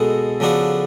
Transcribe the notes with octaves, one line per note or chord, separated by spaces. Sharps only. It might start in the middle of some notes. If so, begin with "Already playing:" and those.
Already playing: B2 G#3 B3 F#4 A4
C#3 F3 B3 D4 F#4